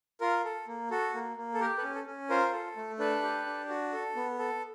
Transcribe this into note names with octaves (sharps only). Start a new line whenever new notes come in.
F4 A#4
A4
A#3
F#4 A4
A#3
A#3
A4
G4 A#4
A4 B4
C#4
A4
C#4
F4 A#4 C5
A4
A3
D4 A4 B4
G4
D4
F#4
A4
B3
A4